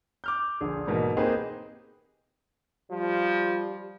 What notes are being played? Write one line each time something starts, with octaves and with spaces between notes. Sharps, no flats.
D6 F6 G6
A#1 D3 G#4
G#2 B2 E3 A#3
A#3 C4 D#4 G4 G#4 B4
F3 G3